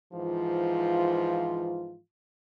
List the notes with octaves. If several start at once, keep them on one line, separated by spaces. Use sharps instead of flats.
G#2 E3 F3 F4